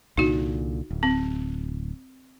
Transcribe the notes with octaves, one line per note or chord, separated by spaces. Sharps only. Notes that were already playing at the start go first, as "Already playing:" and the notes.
C2 A#2 D3 D#4 F#4
D1
C4